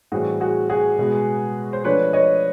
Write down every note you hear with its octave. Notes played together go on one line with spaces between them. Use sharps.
A2 E3 G3 C4 F#4 G#4
F#4 G#4
F#4 G#4
B2 G#3 B3
C5
F3 A3 D4 B4 C#5
C#5 D#5